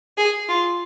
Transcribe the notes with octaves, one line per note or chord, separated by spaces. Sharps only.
G#4
F4